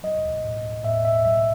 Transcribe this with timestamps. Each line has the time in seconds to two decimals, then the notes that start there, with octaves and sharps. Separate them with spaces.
0.03 F#3 D#5
0.44 A2
0.84 A2 E5
1.05 E5
1.25 F#3 E5